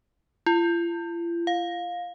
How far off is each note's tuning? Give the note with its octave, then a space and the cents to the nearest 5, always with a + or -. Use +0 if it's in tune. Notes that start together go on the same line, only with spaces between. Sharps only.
F4 -45
F5 +20